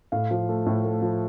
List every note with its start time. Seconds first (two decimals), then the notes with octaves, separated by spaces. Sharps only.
0.12 A2 F5
0.31 F3
0.49 A3
0.66 A2
0.85 A3
1.02 F3